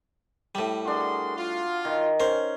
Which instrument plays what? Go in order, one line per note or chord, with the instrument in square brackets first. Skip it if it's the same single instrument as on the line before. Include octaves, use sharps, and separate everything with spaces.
[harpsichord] A2 G3
[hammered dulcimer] D4 F#4 [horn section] G#4 A#4 C6
[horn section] F4
[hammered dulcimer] D#3
[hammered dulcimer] C#4 [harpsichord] A#4 C5